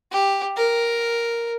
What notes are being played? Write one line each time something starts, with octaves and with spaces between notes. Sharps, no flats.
G4
A#4